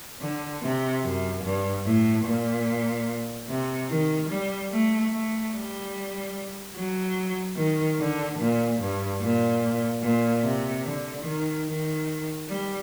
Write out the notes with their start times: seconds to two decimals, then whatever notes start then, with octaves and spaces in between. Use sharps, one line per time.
0.21 D3
0.62 C3
1.03 F#2
1.43 G2
1.85 A2
2.25 A#2
3.49 C3
3.90 D#3
4.30 G3
4.71 A3
5.12 A3
5.53 G3
6.76 F#3
7.57 D#3
7.99 D3
8.39 A#2
8.79 G2
9.21 A#2
10.02 A#2
10.43 C3
10.84 D3
11.25 D#3
11.66 D#3
12.48 G3